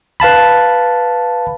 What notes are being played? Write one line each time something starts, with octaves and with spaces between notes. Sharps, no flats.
B4 F5 A5 B5